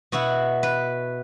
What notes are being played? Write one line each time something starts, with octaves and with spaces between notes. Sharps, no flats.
B2 B3 E4 F#4
B4